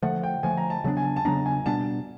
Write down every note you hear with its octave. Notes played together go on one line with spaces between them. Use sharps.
D3 F3 A3 F#5
G5
D3 F3 A3 G#5
A#5
A5
C#3 F#3 B3 D4 A5
G#5
A5
A5
C#3 F#3 B3 D4 A#5
G#5
B2 G3 B3 D4 A5